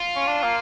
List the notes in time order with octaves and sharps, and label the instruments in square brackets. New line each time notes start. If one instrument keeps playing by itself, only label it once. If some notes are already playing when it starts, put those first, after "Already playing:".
Already playing: [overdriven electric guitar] F4
[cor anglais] C#4
D4
A#3